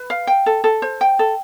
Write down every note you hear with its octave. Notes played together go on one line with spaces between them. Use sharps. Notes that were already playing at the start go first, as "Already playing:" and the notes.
Already playing: B4
F5
G5
A4
A4
C5
G5
A4